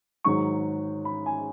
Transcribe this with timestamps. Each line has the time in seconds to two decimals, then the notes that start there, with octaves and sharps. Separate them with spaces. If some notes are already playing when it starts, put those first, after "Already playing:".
0.24 G#2 D#3 F#3 C#6
1.05 B5
1.26 G#5